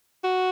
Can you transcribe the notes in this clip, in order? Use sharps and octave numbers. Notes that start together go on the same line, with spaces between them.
F#4